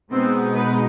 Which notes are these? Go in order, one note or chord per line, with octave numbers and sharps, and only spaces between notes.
B2 G#3 B3 C4 D#4 C5
B3 B4